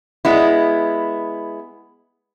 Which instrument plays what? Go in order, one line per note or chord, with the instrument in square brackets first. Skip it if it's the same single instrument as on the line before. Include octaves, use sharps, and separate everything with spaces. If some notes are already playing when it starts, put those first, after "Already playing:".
[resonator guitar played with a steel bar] G#3 B3 E4